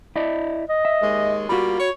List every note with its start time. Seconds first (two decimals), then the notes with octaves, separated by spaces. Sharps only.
0.16 E4 D5 D#5
0.69 D#5
0.85 E5
1.02 D#2 G#3
1.49 G3 A#3 F4 F#4 B5
1.80 C#5